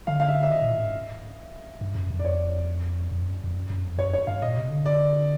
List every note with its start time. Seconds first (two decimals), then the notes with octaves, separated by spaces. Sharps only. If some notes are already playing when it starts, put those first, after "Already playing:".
0.07 D3 F5
0.20 F5
0.29 E5
0.43 E5
0.50 D#3 D#5
0.62 A#2
0.72 A2
0.84 G#2
1.81 G2
1.95 F#2
2.10 F2
2.19 D5
2.25 C#5
3.11 F2
3.22 F#2
3.44 F2
3.55 F#2
3.70 F#2
3.83 F2
3.98 F#2 C#5
4.13 C#5
4.27 G2 F5
4.42 A#2 D#5
4.57 C3
4.70 D3
4.86 D5